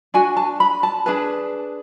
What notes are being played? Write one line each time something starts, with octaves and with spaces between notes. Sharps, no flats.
D4 F#4 G#5
A5
B5
A5
D4 G#4 B4 A5